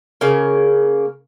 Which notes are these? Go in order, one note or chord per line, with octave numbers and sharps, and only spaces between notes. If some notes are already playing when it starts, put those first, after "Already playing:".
C#3 A#3